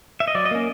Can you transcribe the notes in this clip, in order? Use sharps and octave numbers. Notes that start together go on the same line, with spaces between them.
E5
D#5
F#3 D5
D#5
A#3 C#4